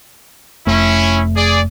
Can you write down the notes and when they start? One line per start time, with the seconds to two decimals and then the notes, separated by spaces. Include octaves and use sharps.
0.67 F1 A3 C#4 E4
1.35 G#4 D5